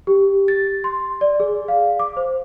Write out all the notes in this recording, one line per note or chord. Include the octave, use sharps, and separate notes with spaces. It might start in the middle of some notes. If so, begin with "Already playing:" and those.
G4
A6
C6
D5
G#4
F5
D6
C5